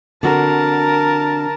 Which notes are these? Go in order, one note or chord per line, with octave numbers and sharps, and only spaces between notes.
D3 C4 F#4 A#4 A5